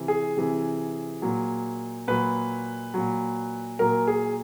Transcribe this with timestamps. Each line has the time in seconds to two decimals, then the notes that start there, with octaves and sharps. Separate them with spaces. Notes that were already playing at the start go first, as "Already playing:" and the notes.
Already playing: C3 E3
0.08 G#4
0.37 C3 E3
1.22 A#2 F#3
2.08 A#2 F#3 B4
2.94 A#2 F#3
3.79 A#2 F#3 A#4
4.07 G#4